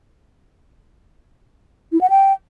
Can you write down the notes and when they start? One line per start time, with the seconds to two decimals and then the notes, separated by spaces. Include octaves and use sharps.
1.92 E4
2.01 F#5
2.10 G5